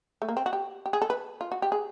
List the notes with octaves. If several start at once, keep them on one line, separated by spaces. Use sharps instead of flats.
A3
A#3
C4
F#4
G4
G4
G#4
A4
B4
F4
F#4
G4
G#4